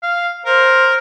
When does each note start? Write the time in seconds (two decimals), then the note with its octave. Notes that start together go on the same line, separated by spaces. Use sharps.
0.03 F5
0.46 A#4 C5